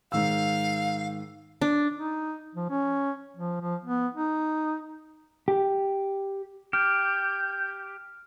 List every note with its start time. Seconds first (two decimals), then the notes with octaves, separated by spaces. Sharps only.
0.12 G#2 D#3 F5 E6
1.61 D4
1.95 D#4
2.55 F3
2.70 C#4
3.37 F3
3.61 F3
3.85 B3
4.15 D#4
5.48 G4
6.73 G4 F6 G6